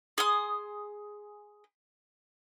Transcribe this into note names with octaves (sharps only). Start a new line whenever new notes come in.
G#4 C6 D#6